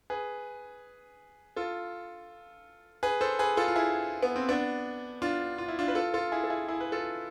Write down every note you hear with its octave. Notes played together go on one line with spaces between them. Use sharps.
G#4 B4
F4 A4
G#4 B4
A4 C5
G#4 B4
F4 A4
F4
E4 G#4
B3
C4
B3 D4
D4 F4
F4
E4
D4 F4
B4
F4 A4
F4 A4
E4 G#4
A4
E4 G#4
E4 G#4
B4
F4 A4